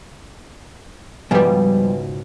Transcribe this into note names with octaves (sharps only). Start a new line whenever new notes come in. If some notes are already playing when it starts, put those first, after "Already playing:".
C#2 G#2 B2 F3 G3 B4 G#5